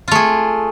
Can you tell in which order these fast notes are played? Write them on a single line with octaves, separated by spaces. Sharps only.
F4 A3 G#4